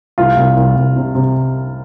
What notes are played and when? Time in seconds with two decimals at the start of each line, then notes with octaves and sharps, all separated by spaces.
0.18 C2 F4
0.37 C2
0.57 C2
0.76 C2
0.96 C3
1.15 C3